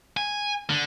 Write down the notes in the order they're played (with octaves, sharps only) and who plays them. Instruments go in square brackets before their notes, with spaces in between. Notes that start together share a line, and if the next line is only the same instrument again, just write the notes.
[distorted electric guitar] G#5
D3